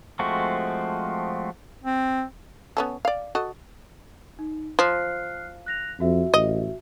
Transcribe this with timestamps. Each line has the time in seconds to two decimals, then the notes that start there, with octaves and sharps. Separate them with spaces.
0.19 F3 G#3 A3 C4 F#4
1.84 C4
2.77 B3 C#4 A4
3.05 D5 F5
3.35 F#4 A4 D#5
4.39 D#4
4.79 F3 F6 F#6 C7
5.66 F#6 A#6 F7
6.00 F2 F#4 E5
6.34 A1 D#5